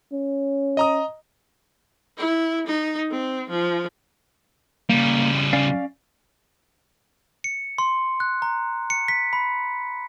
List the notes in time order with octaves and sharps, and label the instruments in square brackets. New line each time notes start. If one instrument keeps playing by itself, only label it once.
[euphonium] C#4
[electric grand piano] D#5 A#5 D#6
[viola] E4
D#4
C4
F3
[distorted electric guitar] C#3 G3 [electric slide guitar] A#3
[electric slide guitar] C#4 D5 F5
[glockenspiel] C#7
C6
F#6
A#5
C#7
B6
B5